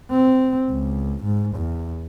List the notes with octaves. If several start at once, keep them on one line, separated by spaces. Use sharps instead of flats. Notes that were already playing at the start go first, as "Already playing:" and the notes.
C4
C#2
G#2
E2